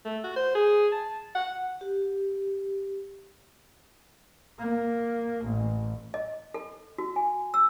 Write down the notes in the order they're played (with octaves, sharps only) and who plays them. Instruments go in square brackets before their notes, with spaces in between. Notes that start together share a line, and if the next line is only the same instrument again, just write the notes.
[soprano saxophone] A3
F#4
C5
G#4
A5
F#5
[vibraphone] G4
[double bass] A#3
A1
[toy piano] D#5
A4
F#4
G#5
E6